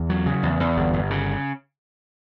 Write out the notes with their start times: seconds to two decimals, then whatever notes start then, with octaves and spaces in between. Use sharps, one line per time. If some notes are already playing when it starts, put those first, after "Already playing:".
Already playing: E2
0.10 F#3
0.26 C#3
0.43 E2
0.60 E2
0.77 G1
0.94 G1
1.10 C#3